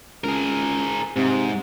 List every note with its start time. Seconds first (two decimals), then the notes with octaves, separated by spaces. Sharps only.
0.24 C#2 G#4 A#4
1.16 G#2 C3